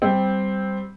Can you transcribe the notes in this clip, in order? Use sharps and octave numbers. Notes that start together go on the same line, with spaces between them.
G3 C4